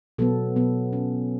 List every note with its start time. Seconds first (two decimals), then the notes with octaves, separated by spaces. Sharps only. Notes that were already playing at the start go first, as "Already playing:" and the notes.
0.18 B2 F#3 B3 A4
0.56 B2 F#3 B3
0.93 C#4